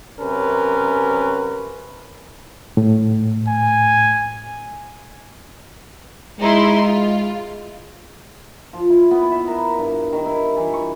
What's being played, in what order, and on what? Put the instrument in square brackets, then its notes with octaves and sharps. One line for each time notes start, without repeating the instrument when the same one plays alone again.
[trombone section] F#2 C3 C#4 A#4 B4
[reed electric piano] A2
[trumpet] G#5
[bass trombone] G#3 [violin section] D#4 E4 C6
[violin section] F4
[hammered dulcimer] F3
E4
B3
E5
A#4
G2
D#3
E4
E3
C#6